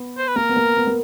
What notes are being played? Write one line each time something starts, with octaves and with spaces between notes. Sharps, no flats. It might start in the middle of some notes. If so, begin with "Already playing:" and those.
Already playing: B3
C5
B4
A#3 A#4
B3
A#3
B3
A#3